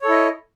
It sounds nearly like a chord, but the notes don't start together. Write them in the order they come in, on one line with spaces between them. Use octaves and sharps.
C#5 A4 E4 D#5